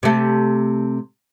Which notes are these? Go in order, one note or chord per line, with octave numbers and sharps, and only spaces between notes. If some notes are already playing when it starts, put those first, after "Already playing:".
C3 A3